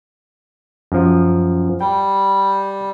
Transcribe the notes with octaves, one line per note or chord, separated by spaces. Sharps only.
F#2 F3
G3 G5